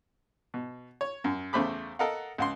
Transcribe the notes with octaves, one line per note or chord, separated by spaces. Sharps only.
B2
C#5
F#2
E2 C#3 A3 C5 B5 D6
A4 A#4 D#5 F5 F#5
C#2 F#5 C6